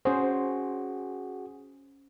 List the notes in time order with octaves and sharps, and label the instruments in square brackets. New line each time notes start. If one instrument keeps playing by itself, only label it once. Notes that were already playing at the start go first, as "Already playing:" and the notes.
[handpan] C#4 C5 [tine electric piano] F#4 G#4